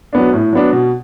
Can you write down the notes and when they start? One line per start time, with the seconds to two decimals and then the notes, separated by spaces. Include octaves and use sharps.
0.13 F#3 B3 D4
0.33 A2
0.53 F#3 B3 D4
0.73 B2